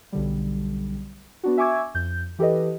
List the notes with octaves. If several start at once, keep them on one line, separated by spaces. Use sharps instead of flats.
B1 D3 G3
B3 D4 F#4
E5 G#5 C#6 D6 E6 G#6
F2 G6
E3 G4 A4 B4 D#5